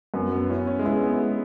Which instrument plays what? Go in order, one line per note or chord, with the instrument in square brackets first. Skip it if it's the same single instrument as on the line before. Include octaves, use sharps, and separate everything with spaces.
[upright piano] F#2 [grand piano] B3
[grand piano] B3
[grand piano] C#4 [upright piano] E4
[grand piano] C#4
G#3
[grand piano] B3 [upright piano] E4
[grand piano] B3
G#3